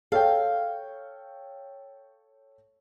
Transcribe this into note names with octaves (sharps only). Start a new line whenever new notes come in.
A4 C#5 F5 G5